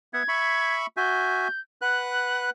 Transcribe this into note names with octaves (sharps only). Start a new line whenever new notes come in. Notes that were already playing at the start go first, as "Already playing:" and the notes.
B3 E5 F#5 G#6
E5 B5 C#6
F#4 E5 G#5 G6
B4 F#5 F#6